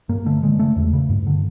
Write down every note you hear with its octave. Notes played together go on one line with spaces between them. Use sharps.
G2 A#3
D3 A3
D3 G#3
C#3 A3
E2
C#3
G2
D3